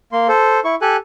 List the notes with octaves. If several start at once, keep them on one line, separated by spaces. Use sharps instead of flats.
A#3 C6
A4 C5
E4 C#6
G4 A4 G#5 F#6